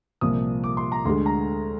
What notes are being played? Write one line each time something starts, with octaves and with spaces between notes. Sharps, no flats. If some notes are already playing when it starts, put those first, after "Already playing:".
C2 A#2 F3 D#6
D6
C6
A#5
D2 D3 G#3 C6
A#5